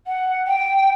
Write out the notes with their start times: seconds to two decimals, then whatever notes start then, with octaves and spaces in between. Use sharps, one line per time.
0.07 F#5
0.47 G5